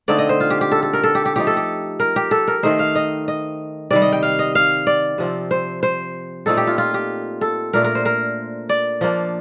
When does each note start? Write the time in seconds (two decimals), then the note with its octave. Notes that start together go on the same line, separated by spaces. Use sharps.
0.08 D3 A3 C4 D#4 D5
0.18 D#5
0.29 C5
0.40 F4
0.50 G4
0.61 G4
0.72 A4
0.83 A4
0.93 A#4
1.04 A4
1.15 G4
1.26 G4
1.36 F3 A3 D#4 G4
1.47 A4
1.57 G4
2.00 A#4
2.16 G4
2.31 A4
2.48 A#4
2.63 D#3 A3 D#4 C5
2.79 F5
2.95 D#5
3.28 D#5
3.91 C3 D#3 G3 D5
4.02 D#5
4.12 G5
4.23 F5
4.39 D#5
4.55 F5
4.87 D5
5.18 C3 F3 C4
5.51 C5
5.83 C5
6.46 A#2 A3 C4 D#4 A4
6.57 G4
6.67 F4
6.78 F4
6.94 G4
7.41 A4
7.73 A#2 A3 D4 F4 A#4
7.84 A#4
7.95 C5
8.05 A#4
8.69 D5
9.01 F3 A#3 D4